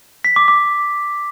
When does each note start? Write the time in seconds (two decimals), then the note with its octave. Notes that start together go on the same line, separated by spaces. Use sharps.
0.25 B6
0.36 D6
0.48 D6